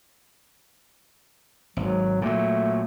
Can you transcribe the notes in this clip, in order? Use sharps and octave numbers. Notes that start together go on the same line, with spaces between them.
G#1 F#3
A#2 F#3 A3